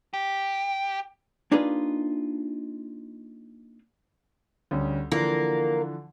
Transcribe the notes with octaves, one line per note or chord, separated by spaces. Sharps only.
G4
A#3 D4 D#4 F4 G#4 B4
D2 G3 C#4
D3 E3 F3 A#3